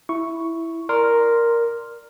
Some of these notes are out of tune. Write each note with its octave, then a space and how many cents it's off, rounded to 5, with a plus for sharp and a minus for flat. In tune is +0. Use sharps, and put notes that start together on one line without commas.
E4 +0 C#6 +0
A#4 +0 D5 +0 C6 +0